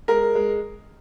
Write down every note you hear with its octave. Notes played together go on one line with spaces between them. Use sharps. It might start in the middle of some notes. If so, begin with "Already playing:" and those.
G#3 A#4
G#3